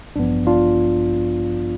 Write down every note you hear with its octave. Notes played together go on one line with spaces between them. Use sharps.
A1 G2 F3 B3 D4
D4 F4